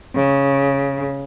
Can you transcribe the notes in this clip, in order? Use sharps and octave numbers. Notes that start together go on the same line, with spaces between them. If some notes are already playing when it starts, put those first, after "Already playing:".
C#3